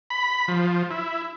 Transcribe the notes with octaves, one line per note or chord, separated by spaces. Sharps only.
B5
F3
E4